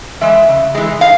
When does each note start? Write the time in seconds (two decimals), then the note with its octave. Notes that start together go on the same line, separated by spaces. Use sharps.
0.21 E3 G#3 E5
0.48 C#3
0.75 E3 G#3
1.01 F5